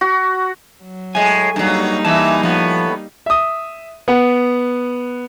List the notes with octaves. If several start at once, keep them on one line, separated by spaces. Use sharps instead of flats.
F#4
F#3
A2 G#3 G#5
G2 F#3 G3 A#3 D#4
E3 E5 A5
A2 F3 B3
E5 D#6
B3 F#5